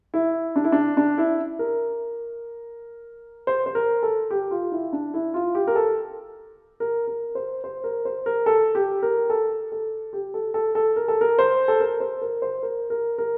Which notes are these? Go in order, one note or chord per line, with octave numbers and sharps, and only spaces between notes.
E4
D4
E4
D4
D4
E4
A#4
C5
C5
A#4
A4
G4
F4
E4
D4
E4
F4
G4
A#4
A4
A#4
A#4
C5
C5
A#4
C5
A#4
A4
G4
A#4
A4
A4
G4
A4
A4
A4
A#4
A4
A#4
C5
A4
A#4
C5
A#4
C5
A#4
A#4
A#4